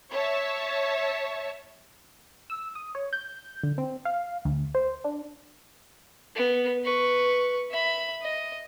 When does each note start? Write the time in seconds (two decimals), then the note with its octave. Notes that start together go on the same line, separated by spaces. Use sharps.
0.12 C#5 E5 A5
2.50 E6
2.75 D#6
2.95 C#5
3.13 G6
3.63 D3
3.78 C4
4.05 F5
4.45 D2
4.75 C5
5.04 D4
6.35 B3
6.84 B4 C#6
7.70 E5 B5
8.21 D#5